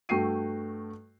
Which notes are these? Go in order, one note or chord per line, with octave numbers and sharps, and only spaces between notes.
G2 A3 F#4 G5 C7 D#7